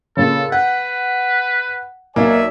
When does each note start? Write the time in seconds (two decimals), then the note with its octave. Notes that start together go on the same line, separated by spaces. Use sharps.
0.17 A#2 C#3 A4
0.52 B4 F#5 G6
2.16 B1 A#3 D5 E5 G#5